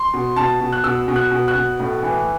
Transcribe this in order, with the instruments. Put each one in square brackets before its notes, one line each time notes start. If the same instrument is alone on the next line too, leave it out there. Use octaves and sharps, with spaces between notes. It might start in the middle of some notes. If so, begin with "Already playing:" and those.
Already playing: [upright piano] C6
B2
B2 A5
B2
F#6
B2 E6
B2
F#6
B2
F#6
B2
A2
E3